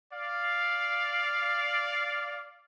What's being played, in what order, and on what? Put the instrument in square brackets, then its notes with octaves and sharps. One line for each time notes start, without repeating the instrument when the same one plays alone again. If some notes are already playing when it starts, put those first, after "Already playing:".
[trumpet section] D5 F5